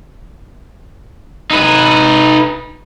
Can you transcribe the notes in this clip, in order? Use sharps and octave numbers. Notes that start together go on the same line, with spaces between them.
D#4 B4